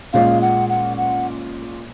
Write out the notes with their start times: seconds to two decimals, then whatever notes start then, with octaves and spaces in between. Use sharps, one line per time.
0.13 A#2 G#3 C#4 F4 F5
0.41 F#5
0.69 F#5
0.97 F#5